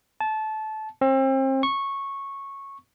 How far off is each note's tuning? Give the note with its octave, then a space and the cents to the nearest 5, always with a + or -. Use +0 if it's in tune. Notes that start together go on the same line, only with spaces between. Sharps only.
A5 -20
C4 +35
C#6 -10